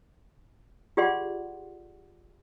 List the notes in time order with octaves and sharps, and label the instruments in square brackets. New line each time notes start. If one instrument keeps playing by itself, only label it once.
[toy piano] F4 G4 G#4 D5 F#5 C6